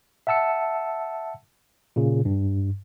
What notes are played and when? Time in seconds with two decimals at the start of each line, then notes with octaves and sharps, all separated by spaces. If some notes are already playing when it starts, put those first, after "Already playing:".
0.27 E5 F#5 A5 E6 C#7
1.96 A#2 C#3
2.25 G2